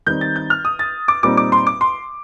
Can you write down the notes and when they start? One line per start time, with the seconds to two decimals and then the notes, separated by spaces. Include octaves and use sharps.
0.06 D#3 G3 C4 D#4 G6
0.21 A6
0.36 G6
0.50 F6
0.65 D#6
0.79 A6
1.08 D6
1.23 A#2 G3 C4 D#4 D6
1.37 D6
1.52 C6
1.67 D6
1.81 C6